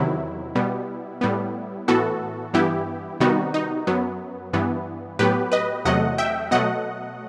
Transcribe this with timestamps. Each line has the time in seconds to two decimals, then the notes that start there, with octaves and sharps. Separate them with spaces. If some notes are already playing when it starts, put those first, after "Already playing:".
Already playing: E2 C3 D#3 F#3 E4
0.55 B2 G3 B3
1.21 A2 G3 B3
1.88 A2 E3 B3 F#4 A4
2.54 G2 E3 B3 E4 G4
3.20 C3 D#3 G3 B3 D#4 F#4
3.54 D#4
3.87 F#2 F#3 B3
4.53 G2 E3 B3
5.19 A2 F#3 B3 G4 B4
5.52 B4 D#5
5.85 E2 C3 F#3 A3 D#5 F#5
6.18 E5 G5
6.51 B2 F#3 A3 D#5 F#5